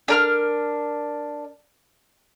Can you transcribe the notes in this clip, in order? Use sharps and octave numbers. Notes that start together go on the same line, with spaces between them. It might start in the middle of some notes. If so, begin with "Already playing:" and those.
D4 A#4 F6